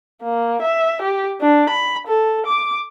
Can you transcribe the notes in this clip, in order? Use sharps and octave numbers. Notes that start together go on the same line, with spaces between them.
A#3
E5
G4
D4
B5
A4
D6